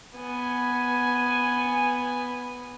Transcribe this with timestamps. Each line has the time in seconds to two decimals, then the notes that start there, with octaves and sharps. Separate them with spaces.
0.16 B3 G#5